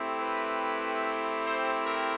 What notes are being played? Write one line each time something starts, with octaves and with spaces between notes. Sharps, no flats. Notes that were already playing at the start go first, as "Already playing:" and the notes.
Already playing: A3 C4 E4 G4
B4
C5
A#4